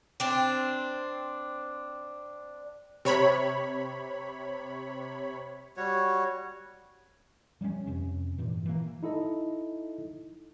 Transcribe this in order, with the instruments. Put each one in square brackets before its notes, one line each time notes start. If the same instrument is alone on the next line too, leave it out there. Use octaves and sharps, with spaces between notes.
[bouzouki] C4 D4
[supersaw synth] C3 C#5 B5
[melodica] G3 F#4 C#5
[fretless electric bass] F3 G3 A3 C#4
F2 C3 C#4
G2 A#2 E3
E3 A#3
[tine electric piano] D#4 E4 A4 D#5